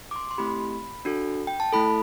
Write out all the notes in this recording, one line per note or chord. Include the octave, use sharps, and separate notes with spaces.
D6
C6
C6
A3 C4 E4 G4 B5
D4 F#4 A4
G5
A5
A3 E4 A4 B5